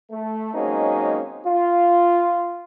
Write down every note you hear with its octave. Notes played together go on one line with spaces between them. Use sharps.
A3
F#3 G#3 A#3 C4 C#4 D#4
F4